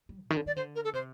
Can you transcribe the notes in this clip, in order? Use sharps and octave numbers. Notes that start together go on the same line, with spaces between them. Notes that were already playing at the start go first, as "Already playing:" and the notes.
G3
A#2
D#3
D3
D#3 D5
D3 C5
A#4
A4
C3 C5